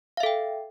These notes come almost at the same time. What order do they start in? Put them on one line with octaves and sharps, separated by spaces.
F5 E5 A4 G5